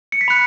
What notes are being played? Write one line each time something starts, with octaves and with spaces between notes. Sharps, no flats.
C#7
B6
B5 F#6 C#7